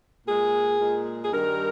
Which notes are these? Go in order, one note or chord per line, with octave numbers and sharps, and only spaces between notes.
A#2 G#3 G#4
A#2 G#3
G#4
G2 D#3 G3 A#4